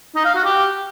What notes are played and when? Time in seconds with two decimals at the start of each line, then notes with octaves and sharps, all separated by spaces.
0.15 D#4
0.25 F5
0.34 F#4
0.44 G4